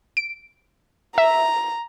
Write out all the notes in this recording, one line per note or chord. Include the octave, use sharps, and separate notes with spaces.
D7
E5 A#5